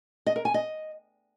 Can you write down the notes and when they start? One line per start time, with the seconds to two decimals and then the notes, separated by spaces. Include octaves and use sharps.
0.26 D#5
0.36 A#4
0.45 G#5
0.54 D#5